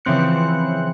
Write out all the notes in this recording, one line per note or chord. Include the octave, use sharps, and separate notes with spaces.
C#3 E3 F3 C4 F#6 C#7